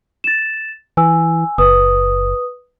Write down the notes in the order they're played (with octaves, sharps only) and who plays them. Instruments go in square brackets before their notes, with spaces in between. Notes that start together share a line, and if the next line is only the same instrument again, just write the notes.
[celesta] A6 E7
[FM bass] E3 [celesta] G#5 E6
[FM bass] F#1 [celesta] B4 D#6